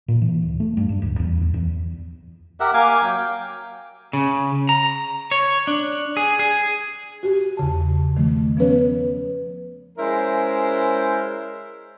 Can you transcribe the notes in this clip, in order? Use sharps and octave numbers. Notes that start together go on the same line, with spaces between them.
A#2
E3
D1
A3
G2
G2
D1
E2
E2
E2
G4 A#4 E5 F#5
A#3 F5 G#5 D6
F#3 G5
G5
C#3
A#5
C#5
D4
G#4
G#4
F#4 G4
E2 C#3 A5
D#3 F3 A3
F3 B3 C#4 B4 C#5
G#3 C#4 E4 A#4 C5